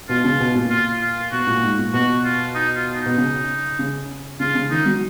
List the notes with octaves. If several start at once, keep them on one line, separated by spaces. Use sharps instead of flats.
B2 F4
C#3
B2
A#2
F4
F4
B2 F#4
A#2
G#2
A#2
B2 F#4
F4
D#4
F4
D#4
B2
C#3
C#3
C#3 F4
C#3
D#3 D#4
F#3